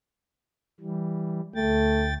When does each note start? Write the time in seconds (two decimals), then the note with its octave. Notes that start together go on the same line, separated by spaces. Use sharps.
0.80 E3 G3
1.55 D2 A3 G5 A6